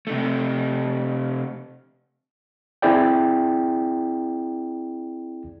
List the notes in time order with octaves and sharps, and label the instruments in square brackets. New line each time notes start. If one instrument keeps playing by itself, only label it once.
[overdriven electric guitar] C3 A3
[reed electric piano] C4 E4 G#4 D5 G5